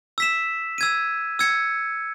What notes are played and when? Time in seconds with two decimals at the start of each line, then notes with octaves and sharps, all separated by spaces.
0.18 E6 B6 E7
0.78 E6 G#6 D#7
1.39 E6 G#6 C#7